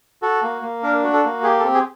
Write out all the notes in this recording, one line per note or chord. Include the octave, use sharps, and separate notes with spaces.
F#4 A4
A#3
A#3
D4 A#4
F#4
A4
A#3
G4 G#4
A4
C4
G#4